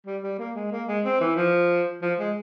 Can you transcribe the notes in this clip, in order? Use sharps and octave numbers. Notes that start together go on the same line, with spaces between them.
G3
G3
A#3
G#3
A#3
G#3
C4
E3
F3
F3
G#3